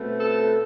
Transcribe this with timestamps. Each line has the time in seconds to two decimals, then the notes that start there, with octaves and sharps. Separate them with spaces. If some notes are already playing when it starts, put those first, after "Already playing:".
Already playing: B2 A3 C4
0.20 A4